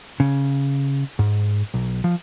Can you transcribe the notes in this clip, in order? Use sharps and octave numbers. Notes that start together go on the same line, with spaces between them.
C#3
G#2
B1
F3